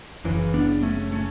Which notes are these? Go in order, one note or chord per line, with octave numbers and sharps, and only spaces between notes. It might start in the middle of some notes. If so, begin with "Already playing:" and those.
F#1 F#2 C#3 E3
B3 D4
A3 C#4
A3 C#4